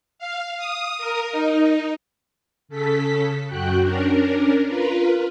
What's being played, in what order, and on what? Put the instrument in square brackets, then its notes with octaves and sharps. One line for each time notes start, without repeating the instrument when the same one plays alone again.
[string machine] F5
D#6
A#4
D#4
C#3 A4 B6
F#2 F#4 G5 F#6
C#4 D4 A#4
F4 A#4 B4